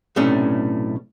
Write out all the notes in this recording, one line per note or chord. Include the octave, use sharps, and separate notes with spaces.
B1 A2 C3 A3 C#4 D4